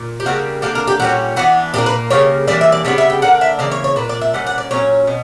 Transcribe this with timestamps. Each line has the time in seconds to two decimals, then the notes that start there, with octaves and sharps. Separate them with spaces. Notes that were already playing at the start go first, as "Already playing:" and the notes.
Already playing: A#2
0.20 G4
0.25 C#3 G3 A#3 D4 F#4
0.62 D3 A#3 D4 G4
0.75 A#4
0.87 G4
1.00 A#2 G3 C#4 F#4
1.36 E3 B3 D4 F#4
1.74 A#2 A#3 D4 G4
1.86 B4
2.10 C#3 G3 A#3 C#5
2.47 E3 G3 A#3 D4 D5
2.61 E5
2.72 D5
2.85 C#3 G3 B3 D4 C#5
2.98 E5
3.10 G5
3.22 D3 A#3 D4 F#5
3.41 E5
3.59 C#3 E3 A#3 D5
3.71 C#5
3.84 C#5
3.96 A#2 A#3 D4 B4
4.09 D5
4.21 E5
4.34 A#2 G3 C#4 F#5
4.47 F#5
4.58 D5
4.71 A#2 F#3 C#4 C#5
5.07 B2